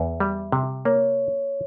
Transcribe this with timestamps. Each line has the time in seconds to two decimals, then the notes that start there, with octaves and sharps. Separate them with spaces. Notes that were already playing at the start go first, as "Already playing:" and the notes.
Already playing: E2 E5
0.20 G3
0.52 C3
0.85 A#3 C#5